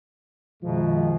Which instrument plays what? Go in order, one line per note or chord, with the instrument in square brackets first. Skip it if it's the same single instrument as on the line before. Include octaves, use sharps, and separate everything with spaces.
[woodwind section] F#2 B2 D#3 [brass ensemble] F3 G#3